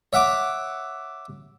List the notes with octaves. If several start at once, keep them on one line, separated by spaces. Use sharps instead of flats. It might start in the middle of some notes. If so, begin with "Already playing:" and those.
C#5 E5 F#5 D6